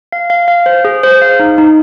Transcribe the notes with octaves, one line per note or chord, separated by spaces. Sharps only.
F5
F5
F5
C5
G#4
C5
F5
D#4
D#4